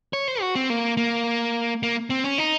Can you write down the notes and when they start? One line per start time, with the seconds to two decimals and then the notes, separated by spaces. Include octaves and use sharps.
0.13 C#5
0.28 C5
0.41 F#4
0.55 C4
0.70 A#3
0.97 A#3
1.83 A#3
2.10 C4
2.24 C#4
2.38 D#4